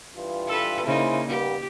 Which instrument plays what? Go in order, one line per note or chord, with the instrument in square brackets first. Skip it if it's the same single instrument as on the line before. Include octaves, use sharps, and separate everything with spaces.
[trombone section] G2 E3 F4
[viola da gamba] A4 B4
[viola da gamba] C#3 A#3 D#4 [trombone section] E4 G#4 C5
[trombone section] G3 A#3 B3 [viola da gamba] G4